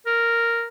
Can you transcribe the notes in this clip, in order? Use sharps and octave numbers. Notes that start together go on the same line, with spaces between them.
A#4